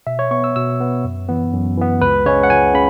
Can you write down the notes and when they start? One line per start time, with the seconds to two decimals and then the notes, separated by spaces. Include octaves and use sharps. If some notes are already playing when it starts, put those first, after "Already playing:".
0.07 B2 E5
0.19 C#5
0.31 B3 C#6
0.44 E6
0.56 B2 E6
0.80 B3
1.04 F#2
1.29 E3 B3
1.54 F#2
1.77 E3 B3
2.01 C#2 B4
2.26 C#3 G#3 C#4 C#5
2.43 F#5
2.50 C#2 G#5
2.74 C#3 B5